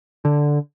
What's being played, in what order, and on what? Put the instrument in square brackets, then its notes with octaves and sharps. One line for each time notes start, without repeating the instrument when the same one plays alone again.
[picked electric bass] D3